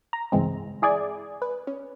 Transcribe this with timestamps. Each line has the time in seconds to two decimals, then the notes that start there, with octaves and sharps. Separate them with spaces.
0.13 A#5
0.32 C#2 G2 E3 G#3 C4
0.82 E4 G#4 D5 G#5
1.42 B4
1.67 C#4